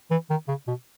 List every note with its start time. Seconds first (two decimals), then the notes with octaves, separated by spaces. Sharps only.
0.11 E3
0.30 D#3
0.48 C#3
0.68 B2